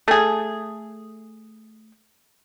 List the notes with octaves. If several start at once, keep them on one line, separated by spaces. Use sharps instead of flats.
A3 G#4